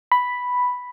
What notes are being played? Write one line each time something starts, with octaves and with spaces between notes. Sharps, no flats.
B5